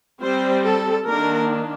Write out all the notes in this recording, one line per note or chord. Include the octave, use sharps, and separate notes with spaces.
G3 C4 C5
A4
D#3 A#3 D4 A#4